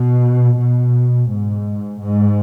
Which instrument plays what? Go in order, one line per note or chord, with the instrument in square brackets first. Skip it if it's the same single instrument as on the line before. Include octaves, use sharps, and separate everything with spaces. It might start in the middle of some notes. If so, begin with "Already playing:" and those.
Already playing: [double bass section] B2
B2
G#2
G#2